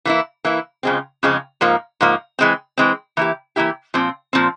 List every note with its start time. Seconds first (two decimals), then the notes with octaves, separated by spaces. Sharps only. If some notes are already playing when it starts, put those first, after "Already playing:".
0.05 E3 A#3 E4
0.45 E3 A#3 E4
0.83 F2 C#3 F3 G#3 C4
1.23 F2 C#3 F3 G#3 C4
1.61 G#2 F3 A#3
2.01 G#2 F3 A#3
2.39 E3 G#3 C4
2.78 E3 G#3 C4
3.17 E3 A#3 E4 G4
3.56 E3 A#3 E4 G4
3.94 A#2 F3 C4
4.33 A#2 F3 C4